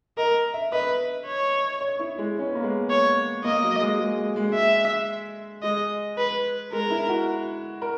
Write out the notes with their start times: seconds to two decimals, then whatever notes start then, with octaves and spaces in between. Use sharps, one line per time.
0.17 A#4 D#5
0.54 E5
0.72 B4 D#5
1.26 C#5
1.81 C#5
1.99 E4
2.18 G#3
2.39 C#4
2.47 B3
2.55 A#3
2.63 G#3
2.90 C#5
3.45 A#3 D#5
3.63 F#3
3.81 G#3
4.00 G#3
4.18 G#3
4.36 G#3
4.54 E5
5.63 G#3 D#5
6.18 B4
6.72 G#3 A#4
6.90 E4
7.09 F#4
7.82 A#4